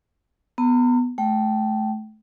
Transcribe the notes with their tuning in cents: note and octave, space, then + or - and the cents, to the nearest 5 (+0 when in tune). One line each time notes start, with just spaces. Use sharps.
B3 +0 A#5 -40
A3 -30 G5 -20